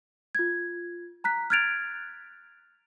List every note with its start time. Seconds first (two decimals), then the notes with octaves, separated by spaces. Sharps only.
0.35 F4 G#6
1.24 A#5 F#6 B6
1.50 F6 F#6 G#6 A6 D7 F7